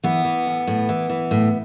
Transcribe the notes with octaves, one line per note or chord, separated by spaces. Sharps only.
E3 B3
E3
A2
A2
E3
E3
A2